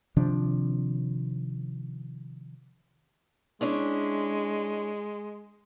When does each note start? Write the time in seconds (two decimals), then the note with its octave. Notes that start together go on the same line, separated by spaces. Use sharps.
0.17 C3 D#3 F3 D4
3.61 G#3 C#4 D4 E4